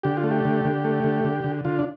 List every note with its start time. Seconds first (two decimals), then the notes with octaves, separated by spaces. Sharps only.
0.03 D3 G4
0.17 F4
0.24 A3
0.31 G4
0.45 D3
0.65 D3
0.84 A3
1.04 D3
1.24 D3
1.44 D3
1.65 D3 F4
1.79 D4